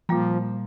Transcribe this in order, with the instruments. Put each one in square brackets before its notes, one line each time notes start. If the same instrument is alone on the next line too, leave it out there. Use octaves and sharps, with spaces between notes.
[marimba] A#2 G3 A#3 [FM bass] F3